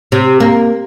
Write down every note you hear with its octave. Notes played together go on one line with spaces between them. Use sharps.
C3
A#3